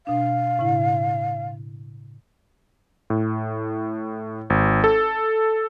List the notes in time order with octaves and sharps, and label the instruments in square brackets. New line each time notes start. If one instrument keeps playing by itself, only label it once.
[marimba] B2 D4 [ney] F5
[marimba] A2 C#3 E4
[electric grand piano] A2
G#1
A4